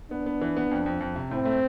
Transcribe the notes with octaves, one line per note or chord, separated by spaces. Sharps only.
B3 D4
B3
E3
B3
F2
F2
F2
C3
A2 C4
A3